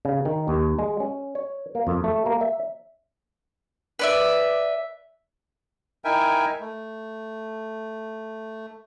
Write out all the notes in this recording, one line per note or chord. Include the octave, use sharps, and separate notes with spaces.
C#3
D#3
D#2
G#3
C#4
C#5
A#3
F2
A3
A#3
E5
B4 D5 E5
D#4 E4 A#4 E5 G5 G#5
A3